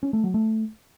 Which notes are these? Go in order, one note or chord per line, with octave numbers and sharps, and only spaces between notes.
C#4
A3
F#3
A3